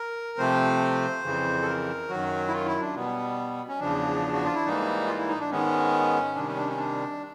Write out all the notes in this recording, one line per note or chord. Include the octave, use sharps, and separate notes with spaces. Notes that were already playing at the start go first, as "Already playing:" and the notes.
Already playing: A#4
C3 F3 A3 C4 C5
F2 C#3 E3
A4
A#4
F#2 D#3 F#3 F#4
E4
F4
E4
D4
B2 G3 B3
C#4
E2 C#3 F3 D4
F#4
F4
E4
G#2 E3 G3 A#3 D#4
F4
E4
D#4
D4
G#2 D#3 G#3 B3 C#4
C3 D#3 G3 D4
C#4
D4
C#4
D4